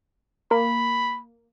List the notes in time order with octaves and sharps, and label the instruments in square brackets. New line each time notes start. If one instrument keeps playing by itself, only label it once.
[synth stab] A#3 [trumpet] B5